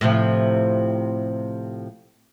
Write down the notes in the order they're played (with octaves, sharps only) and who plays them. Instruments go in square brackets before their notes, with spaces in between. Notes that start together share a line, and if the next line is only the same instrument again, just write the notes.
[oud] A2 C3 F3